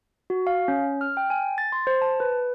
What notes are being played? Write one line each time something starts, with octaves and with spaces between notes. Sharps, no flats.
F#4
F5
C#4
F6
G5
G#5
A6
C6
C5
A5
B4